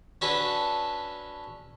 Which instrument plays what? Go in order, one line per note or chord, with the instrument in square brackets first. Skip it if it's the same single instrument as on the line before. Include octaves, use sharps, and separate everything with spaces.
[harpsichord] C#4 D4 F#4 A4 B4